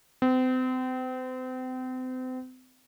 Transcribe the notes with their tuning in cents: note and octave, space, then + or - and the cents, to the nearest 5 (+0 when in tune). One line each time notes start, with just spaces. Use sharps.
C4 -35